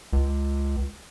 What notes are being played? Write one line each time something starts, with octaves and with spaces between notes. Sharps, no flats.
C#2